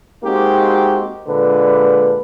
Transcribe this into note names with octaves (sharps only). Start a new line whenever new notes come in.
G#3 A#3 C4 D#4 F#4 G4
A#2 D3 G#3 B4